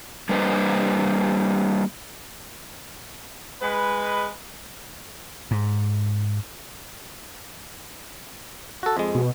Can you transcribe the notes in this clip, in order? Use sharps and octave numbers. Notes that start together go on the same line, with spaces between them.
G3 A#3 D4 B4 C5 D#5
G#3 B4
G#2
F#4 A4
F2 G#3
B2